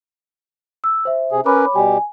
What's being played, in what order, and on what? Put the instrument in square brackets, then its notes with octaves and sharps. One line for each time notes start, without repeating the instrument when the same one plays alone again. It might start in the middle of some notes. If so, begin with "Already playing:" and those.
[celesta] E6
C5 E5
[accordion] C3 G#4
[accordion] C#4 A#4 B4 [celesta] C#5 B5 D6
[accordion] B2 G3 G4 [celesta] G#5